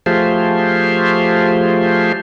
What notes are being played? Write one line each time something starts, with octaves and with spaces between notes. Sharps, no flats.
F3 A3 F4 G4 G#4 C5